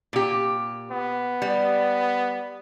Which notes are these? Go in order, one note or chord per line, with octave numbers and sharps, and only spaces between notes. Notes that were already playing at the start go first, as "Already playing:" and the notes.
A#2 G4
B3
G3